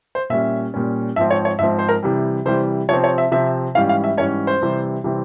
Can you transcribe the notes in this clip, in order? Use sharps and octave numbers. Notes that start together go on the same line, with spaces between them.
C5
A#2 G3 C#4 E5
A#2 G3 C#4
G#2 F3 C4 E5
C#5
C#5
G#2 F3 C4 E5
C5
A#4
C3 E3 G3
C3 E3 G3 C5
C3 F3 C4 C#5
C#5
E5
C3 F3 C4 E5
G#2 E3 G3 C#4 F5
F5
E5
G#2 E3 G3 C#4 C#5
C5
C3 E3 G3 C4
C3 E3 G3 C4